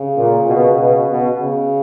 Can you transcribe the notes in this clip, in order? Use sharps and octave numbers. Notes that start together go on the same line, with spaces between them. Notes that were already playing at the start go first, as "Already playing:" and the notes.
Already playing: C#3
A#2
B2
B2
B2
C#3